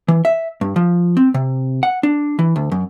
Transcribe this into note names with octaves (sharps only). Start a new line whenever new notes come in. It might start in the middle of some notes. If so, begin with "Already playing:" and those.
E3
E5
G2
F3
C4
C3
F#5
D4
E3
D2
F#2